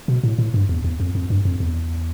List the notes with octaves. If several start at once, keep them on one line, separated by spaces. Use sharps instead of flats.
B2
A2
A2
G2
E2
E2
F2
F2
G2
F2
E2